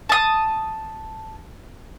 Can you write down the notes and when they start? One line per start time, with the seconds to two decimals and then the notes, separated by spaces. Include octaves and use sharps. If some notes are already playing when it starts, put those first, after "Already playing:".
0.09 A5 D#6